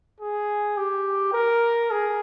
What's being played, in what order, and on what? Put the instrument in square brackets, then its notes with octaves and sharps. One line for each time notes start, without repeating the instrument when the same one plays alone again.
[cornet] G#4
G4
A#4
G#4